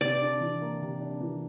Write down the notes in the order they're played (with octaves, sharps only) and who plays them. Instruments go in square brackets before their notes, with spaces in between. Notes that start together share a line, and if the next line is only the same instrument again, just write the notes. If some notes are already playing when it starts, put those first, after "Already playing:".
[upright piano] C3 [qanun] D5
[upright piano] D4
E3
A#3
C3
D4
E3